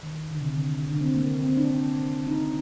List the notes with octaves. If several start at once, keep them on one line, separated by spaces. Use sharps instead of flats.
D#3
D3
C3
D3
D3
D4
C4
A#3
C4
D4
D4
D#4
D4